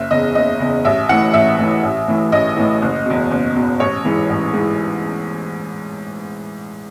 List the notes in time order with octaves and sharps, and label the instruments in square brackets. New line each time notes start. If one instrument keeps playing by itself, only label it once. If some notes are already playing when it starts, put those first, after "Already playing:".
Already playing: [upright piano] F#1 E5
E2 C#3 D#5
F#1 D#5
E2 C#3
A1 E5
A2 E3 F#5
A1 E5
A2 E3
A1
A2 E3
A1 D#5
A2 E3
F#1
E2 B2
F#1
E2 B2
A1 C#5
G#2 E3
A1
G#2 E3